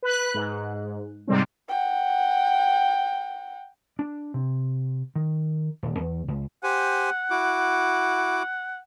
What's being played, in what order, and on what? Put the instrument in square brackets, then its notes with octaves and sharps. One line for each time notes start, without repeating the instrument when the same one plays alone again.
[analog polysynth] B4 F#6
G#2
G#2 C3 G3 C4
[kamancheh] F#5 G5
[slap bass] D4
C3
D#3
D#1
E2
C#2
[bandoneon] G4 C5 G#5 [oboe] F#5
[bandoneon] E4 F#4 D6